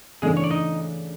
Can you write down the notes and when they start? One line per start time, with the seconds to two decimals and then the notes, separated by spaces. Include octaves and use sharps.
0.22 C#3 E3 G#3 A3 D4 G#4
0.37 C#5
0.44 D5
0.50 D#4 D#5